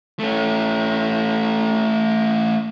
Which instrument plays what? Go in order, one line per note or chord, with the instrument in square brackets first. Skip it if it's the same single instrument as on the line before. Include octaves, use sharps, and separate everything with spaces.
[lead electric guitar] A3 C#4